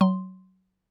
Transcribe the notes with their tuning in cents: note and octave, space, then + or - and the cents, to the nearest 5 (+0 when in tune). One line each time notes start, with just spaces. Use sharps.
F#3 +20 C6 +0